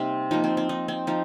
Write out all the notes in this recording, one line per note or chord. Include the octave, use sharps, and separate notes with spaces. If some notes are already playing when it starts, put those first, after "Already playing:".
Already playing: C3 G3 A#3 C4 D#4
F3 A#3 D#4
C4
C4
D#4
C4
F3 D#4